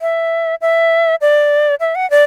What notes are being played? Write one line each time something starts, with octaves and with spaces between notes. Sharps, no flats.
E5
E5
D5
E5
F#5
D5